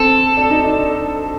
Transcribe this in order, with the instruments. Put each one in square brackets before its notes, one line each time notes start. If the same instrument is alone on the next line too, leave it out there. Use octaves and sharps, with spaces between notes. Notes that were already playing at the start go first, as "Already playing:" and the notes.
Already playing: [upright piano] C4 [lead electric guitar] A4
[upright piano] D4
D#4
D4